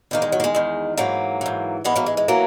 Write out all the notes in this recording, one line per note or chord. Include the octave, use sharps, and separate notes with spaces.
E2 D#3 A#3
G#3
F#3
A#3
G#3
E2 D#3
G#2 E3 F#3 A#3
G#2 E3
G#2 E3 G#3 B3
F#3 A#3
G#3
G#3
E3 F#3 A#3